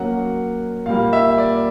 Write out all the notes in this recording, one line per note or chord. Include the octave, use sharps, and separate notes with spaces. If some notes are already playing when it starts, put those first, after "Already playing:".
Already playing: F#3 A#3 C#4 F#5
A#2 G3 A#3 F5
E5
D5